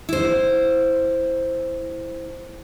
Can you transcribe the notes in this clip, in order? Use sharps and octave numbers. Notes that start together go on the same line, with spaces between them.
E4 C5